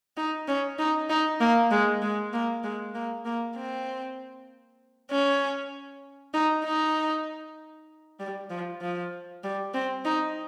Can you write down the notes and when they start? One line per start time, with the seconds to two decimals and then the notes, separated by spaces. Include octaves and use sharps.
0.17 D#4
0.48 C#4
0.79 D#4
1.09 D#4
1.40 A#3
1.71 G#3
2.02 G#3
2.33 A#3
2.64 G#3
2.94 A#3
3.25 A#3
3.56 C4
5.11 C#4
6.34 D#4
6.65 D#4
8.20 G3
8.50 F3
8.81 F3
9.44 G3
9.74 C4
10.05 D#4